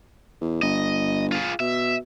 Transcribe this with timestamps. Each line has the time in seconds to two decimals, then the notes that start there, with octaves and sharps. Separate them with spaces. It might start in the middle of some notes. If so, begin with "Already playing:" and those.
0.41 E2
0.62 G1 D#5
1.32 F4 G#4
1.60 B2 E5